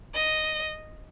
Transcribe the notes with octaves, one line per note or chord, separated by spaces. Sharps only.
D#5